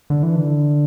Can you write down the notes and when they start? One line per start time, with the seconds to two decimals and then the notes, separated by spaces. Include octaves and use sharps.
0.10 D3
0.23 E3
0.36 D3